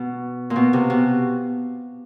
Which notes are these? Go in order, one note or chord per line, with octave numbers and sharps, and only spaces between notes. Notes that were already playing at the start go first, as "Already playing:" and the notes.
Already playing: B2
A#2
B2
C3
B2